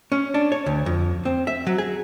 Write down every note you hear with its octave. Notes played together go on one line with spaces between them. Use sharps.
C#4
D4
C#5
D2
F2
C4
E5
F#3
G#4